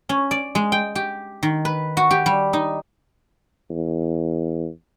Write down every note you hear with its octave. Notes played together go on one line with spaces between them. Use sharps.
C#4
D5
G#3
G5
G4
D#3
B4
F#4
G4
G3
D#4
E2